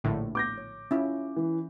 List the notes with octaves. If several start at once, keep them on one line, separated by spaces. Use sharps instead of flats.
A#1 A2 D3
D6 G6 A#6
C#5
C#4 E4 F4
E3